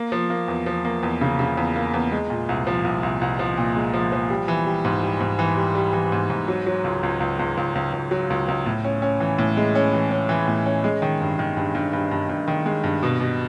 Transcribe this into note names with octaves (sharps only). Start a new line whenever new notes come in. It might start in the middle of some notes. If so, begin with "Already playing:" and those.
Already playing: A#3
F3
A#3
E2
F3
A#3
E2
C#3
C#3
E2
A#3
E2
G#3
A#2
C2
F3
C2
C2
C2
F3
A#2
G#3
F3
F3
G3
E3
G3
G#2
G3
G#2
E3
G3
G3
E3
G#2
G#2
F#3
F#3
C#2
C#2
C#2
C#2
C#2
C#2
C#2
F#3
C#2
C#2
A2
C#4
C#4
E3
A2
G#3
C#4
E3
C#4
E3
A2
C#4
G#3
D#3
G2
D#3
G2
G2
G2
G2
G2
D#3
G#3
G2
B2
B2